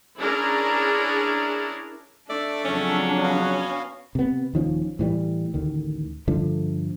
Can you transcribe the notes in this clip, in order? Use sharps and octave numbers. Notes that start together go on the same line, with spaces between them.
C#4 D4 E4 G#4 A#4
A3 D4 A4 D5 E5
F2 C#3 F#3 C#4
B3 F#4 F5
C3 B3
D#1 D#3 F3 C#4
A2 E3 G3
A1 D2 D#3
G2 D3 F3 A3